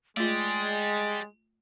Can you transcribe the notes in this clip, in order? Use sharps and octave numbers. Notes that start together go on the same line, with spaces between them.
G#3 A3 F4 G4 D5 A6